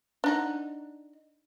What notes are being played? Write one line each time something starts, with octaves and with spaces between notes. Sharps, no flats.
D4 D#4 F#5